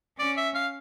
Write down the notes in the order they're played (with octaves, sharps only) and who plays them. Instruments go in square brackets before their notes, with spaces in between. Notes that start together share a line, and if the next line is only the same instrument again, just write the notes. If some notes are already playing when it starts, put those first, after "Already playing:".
[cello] C#4 [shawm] D5
[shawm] E5
F5